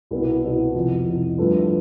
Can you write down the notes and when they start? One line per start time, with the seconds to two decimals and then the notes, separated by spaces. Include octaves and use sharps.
0.11 C2 B2 B3 E4
0.43 C2 B2 B3 E4
0.75 F2 C3 E3
1.06 F2 C3 E3
1.38 G2 F3 A3 E4 B4